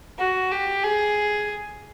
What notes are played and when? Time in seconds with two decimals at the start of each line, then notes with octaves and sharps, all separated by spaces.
0.19 F#4
0.51 G4
0.84 G#4